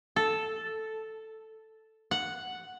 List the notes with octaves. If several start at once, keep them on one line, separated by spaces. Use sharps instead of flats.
A4
F#5